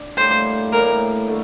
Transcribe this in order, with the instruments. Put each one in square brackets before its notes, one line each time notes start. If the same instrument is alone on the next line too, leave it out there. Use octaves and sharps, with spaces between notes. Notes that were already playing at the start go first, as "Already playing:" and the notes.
Already playing: [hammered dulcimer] D4
[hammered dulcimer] A2 G3 A#3 [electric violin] C5
[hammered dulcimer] A2 G3 A#3 [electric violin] A#4
[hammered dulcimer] D3 A3